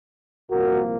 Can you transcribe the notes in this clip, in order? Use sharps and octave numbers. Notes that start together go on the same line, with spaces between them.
C2 A#2 F3 A#3 F#4 A#4